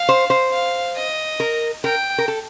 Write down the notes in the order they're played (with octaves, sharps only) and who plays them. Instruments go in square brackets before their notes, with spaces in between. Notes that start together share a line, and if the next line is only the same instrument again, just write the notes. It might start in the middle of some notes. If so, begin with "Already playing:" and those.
Already playing: [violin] F5
[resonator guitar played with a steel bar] C5
C5
[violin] F5
D#5
[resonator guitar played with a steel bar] A#4
[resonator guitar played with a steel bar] A#4 [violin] G5
[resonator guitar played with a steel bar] A#4
A4